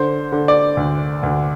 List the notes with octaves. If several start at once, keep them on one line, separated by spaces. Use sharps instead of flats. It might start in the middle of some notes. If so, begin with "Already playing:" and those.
Already playing: D3 C5
D3
D5
D2
D2